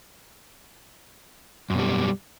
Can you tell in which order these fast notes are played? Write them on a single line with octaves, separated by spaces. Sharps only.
F#2 B2 G3